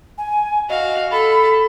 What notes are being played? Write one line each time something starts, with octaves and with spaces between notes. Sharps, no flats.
G#5
F#4 D#5 F5
A4 A5 B5